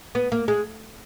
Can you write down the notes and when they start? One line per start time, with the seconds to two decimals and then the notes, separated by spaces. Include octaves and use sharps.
0.15 B3
0.32 A#3
0.48 G#3